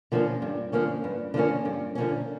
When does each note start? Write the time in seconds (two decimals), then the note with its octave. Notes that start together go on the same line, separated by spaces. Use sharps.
0.12 D3 F3 A#3 C#4
0.42 G2
0.72 D3 F3 A#3 C#4
1.04 G2
1.34 D3 F3 A#3 C#4
1.65 G2
1.95 D3 F3 A#3 C#4